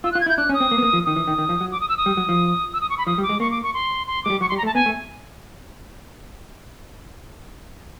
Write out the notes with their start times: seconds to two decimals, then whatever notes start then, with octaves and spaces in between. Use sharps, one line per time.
0.04 F4 E6
0.12 F#6
0.15 F4
0.21 G#6
0.26 E4
0.29 G6
0.38 D4 F#6
0.49 C#4
0.54 D#6
0.60 C4
0.71 A#3
0.78 B3
0.83 A#3
0.93 F3
1.05 D#3 D#6
1.16 E3
1.27 D#3
1.38 D#3
1.49 F3
1.61 F#3
1.72 D6
1.81 D#6
1.89 E6
1.97 D#6
2.06 G3
2.17 F#3
2.29 F3
2.73 E6
2.81 D#6
2.90 C#6
2.98 B5
3.07 F3 D#6
3.18 G3
3.23 D6
3.29 G#3
3.40 A#3 C#6
3.51 D6
3.63 C#6
3.74 C6
4.07 C6
4.24 G#3 D6
4.30 G3
4.41 F#3 C#6
4.49 C6
4.52 G3
4.58 A#5
4.63 A3
4.66 A5
4.75 B3 G#5
4.86 A3